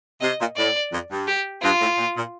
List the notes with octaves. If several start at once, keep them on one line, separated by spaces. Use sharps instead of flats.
C3 D#5
A#2
A2 D5
F2
G2
G4
G2 F4
A2
A#2
A#2